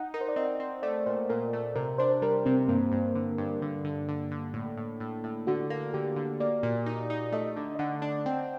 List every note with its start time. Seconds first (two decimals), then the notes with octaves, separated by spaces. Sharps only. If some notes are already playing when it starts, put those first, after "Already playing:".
Already playing: D#4 F#5
0.14 D#4 A#4
0.21 C5
0.29 D5
0.36 C4 D#5
0.60 C4
0.82 A3 D5
1.06 A#2 C5
1.30 A#2 A#4
1.53 A3
1.76 C3 A#4
1.98 D4 C5
2.22 G3 A#4
2.45 C3 C4
2.68 G2 A#3
2.92 G2
3.15 D3
3.38 G2
3.62 D3
3.84 D3
4.08 D3
4.31 D3
4.54 A2
4.77 A2
5.00 A2
5.24 A2
5.47 D3 F#4
5.70 A#3
5.94 D3 G4
6.16 D3
6.40 A#3 D5
6.63 A#2
6.86 D#4
7.10 D#4
7.32 A3 D#5
7.57 D3
7.75 D#5
7.79 D3 F#5
8.02 D4
8.26 C4 G5